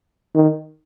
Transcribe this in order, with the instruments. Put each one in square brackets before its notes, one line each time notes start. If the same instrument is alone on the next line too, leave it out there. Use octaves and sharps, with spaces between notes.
[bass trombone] D#3